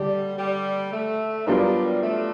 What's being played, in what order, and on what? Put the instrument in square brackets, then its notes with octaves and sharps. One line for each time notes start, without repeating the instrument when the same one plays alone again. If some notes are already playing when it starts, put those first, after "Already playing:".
Already playing: [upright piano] D3 [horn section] G3
[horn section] G3
A3
[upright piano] F#3 B3 D4 F4 A#4 [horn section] G3
[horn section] A3